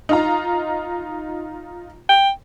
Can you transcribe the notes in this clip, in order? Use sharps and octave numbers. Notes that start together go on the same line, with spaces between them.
D#4 F4 A#5
G5